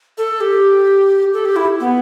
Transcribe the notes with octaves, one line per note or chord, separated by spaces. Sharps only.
A4
G4
A4
G4
E4
B3